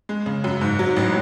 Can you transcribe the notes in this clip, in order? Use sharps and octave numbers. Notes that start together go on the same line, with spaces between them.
G#3
C#3
F#2
G#2
F#3
A1